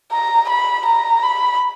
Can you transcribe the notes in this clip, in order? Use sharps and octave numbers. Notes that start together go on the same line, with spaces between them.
A#5
B5
A#5
B5